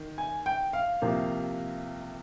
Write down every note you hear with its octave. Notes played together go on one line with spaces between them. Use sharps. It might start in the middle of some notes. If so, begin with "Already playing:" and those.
Already playing: D#3
G#5
G5
F5
C2 C3 F3 A#3